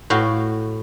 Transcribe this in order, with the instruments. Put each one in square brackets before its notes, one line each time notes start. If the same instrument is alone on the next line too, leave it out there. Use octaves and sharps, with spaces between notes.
[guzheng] A2 F#4 F5 G5